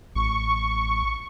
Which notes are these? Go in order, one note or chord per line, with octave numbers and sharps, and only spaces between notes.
A1 C#6